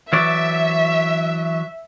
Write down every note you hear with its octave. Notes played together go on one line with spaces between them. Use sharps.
E3 F#3 D5 E5